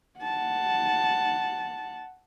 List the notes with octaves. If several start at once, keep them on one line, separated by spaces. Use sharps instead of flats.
F#5 A5